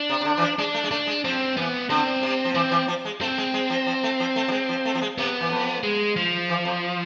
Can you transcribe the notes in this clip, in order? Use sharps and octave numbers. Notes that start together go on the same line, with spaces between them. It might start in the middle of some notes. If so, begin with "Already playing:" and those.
Already playing: D4
C3
C3
D3
E3
F3
G#3 D4
A3
G#3
A3 D4
G#3
F3 C4
E3 B3
D3 C4
C3
F3
E3 C4
E3
F3
G#3
A3 C4
G#3
G#3
F3
F3
A3
F3
A3
F3
G#3
F3
A3
F3
G#3
C3 B3
E3
F2
G#3
F3
E3
F2